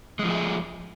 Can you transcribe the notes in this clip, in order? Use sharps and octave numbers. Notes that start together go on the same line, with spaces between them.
F3 G#3 A3 G#4